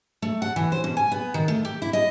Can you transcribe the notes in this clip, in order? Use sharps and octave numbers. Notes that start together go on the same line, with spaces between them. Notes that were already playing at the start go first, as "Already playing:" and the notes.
A3
F#5
E3
C5
B2
G#5
B3
D#3
A3
G4
E4
D#5